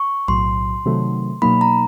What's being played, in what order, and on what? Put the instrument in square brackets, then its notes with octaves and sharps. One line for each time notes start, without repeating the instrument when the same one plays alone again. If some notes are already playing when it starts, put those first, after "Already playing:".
Already playing: [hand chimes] C#6
[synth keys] B1 A2 F#3 [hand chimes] C6
[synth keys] C3 D#3 F#3 A3
[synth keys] B2 F#3 A#3 D#4 [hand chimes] B5
[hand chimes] A#5